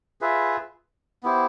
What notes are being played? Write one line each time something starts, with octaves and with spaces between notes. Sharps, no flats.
F4 G#4 B4 E5
B3 E4 G4 C5